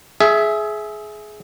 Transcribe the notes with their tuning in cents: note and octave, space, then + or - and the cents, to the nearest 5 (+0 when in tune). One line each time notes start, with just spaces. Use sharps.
G#4 +20 E5 +0